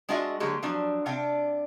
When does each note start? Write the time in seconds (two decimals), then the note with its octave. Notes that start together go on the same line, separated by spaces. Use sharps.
0.09 G#3 D4 F4 F#4 D#5 E5
0.40 D3 F#3 G#3 A#3 G4
0.63 F3 F#3 D4
1.06 C3 D4 F5 G5